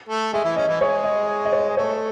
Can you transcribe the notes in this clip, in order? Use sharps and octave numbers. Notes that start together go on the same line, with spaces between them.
A3 A4
G#3 G#4 E5
E3 E4
C#4 D#5
E3 E4
G#3 G#4 C#5
D#5
D#5
C#5
G#4
A3 A4 C#5